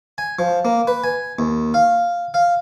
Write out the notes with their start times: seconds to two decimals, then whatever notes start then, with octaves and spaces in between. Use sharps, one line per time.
0.18 G#5
0.39 F3
0.65 A#3
0.87 B4
1.04 G#5
1.39 D#2
1.74 F5
2.34 F5